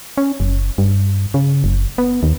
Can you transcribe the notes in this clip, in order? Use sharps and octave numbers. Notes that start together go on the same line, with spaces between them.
C#4
F#1
G2
C#3
F#1
B3
D#2